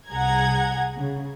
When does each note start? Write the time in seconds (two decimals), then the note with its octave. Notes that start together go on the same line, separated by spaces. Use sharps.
0.11 C2 G#4 F#5 A#5 G#6
0.96 C#3